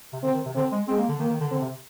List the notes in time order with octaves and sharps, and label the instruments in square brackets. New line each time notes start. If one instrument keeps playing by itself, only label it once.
[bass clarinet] C3
[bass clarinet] D3 [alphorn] C4
[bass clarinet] D#3
C3
[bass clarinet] D3 [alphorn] C4
[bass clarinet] G#3
[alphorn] G#3 [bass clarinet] C4
[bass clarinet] A#3
D3
[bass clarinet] D#3 [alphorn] A#3
[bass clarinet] D#3
D3
[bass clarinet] D3 [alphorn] C4
[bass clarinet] C3